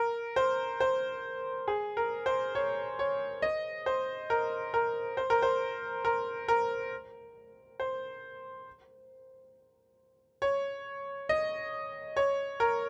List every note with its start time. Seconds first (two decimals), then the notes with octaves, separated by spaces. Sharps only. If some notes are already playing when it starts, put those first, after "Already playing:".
Already playing: A#4
0.36 C5
0.80 C5
1.68 G#4
1.97 A#4
2.26 C5
2.55 C#5
2.99 C#5
3.42 D#5
3.86 C5
4.30 A#4
4.74 A#4
5.17 C5
5.30 A#4
5.42 C5
6.05 A#4
6.48 A#4
7.80 C5
10.42 C#5
11.29 D#5
12.17 C#5
12.60 A#4